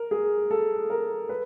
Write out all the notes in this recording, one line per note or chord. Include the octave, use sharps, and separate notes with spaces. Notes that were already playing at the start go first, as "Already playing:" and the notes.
Already playing: A#4
G#4
A4
A#4
B4